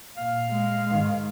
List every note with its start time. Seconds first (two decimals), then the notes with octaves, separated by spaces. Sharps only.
0.17 A#2 F5
0.48 G#3
0.89 G#2 D#3